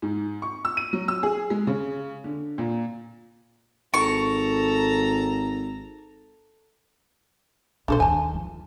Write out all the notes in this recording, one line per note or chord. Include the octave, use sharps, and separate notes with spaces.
G#2
C#6
E6
D#7
F#3
E6
G#4
G#3
C#3
D3
A#2
G#1 A4 A#5 C#6
A#1 B2 D4 A4 C5
D#2 D#3 G#5 A5
F3